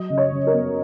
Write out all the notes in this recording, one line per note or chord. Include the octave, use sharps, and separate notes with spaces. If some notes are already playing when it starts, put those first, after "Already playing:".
Already playing: F#3 D#5
C#3
C#5
C#3
A#4
B3